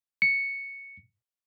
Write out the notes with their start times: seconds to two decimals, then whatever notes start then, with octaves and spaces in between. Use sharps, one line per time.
0.22 C#7